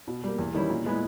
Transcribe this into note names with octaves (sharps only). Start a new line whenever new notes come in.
B2
G3 A#3
E2
D#3 G3 C#4 E4
A#2
G#3 B3 E4